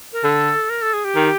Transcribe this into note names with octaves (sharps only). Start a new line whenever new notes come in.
A#4
D3 A4
A#4
A4
G#4
G4
D#3